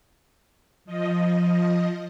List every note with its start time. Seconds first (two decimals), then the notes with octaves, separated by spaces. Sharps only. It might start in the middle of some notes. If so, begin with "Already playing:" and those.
0.85 F3 D#5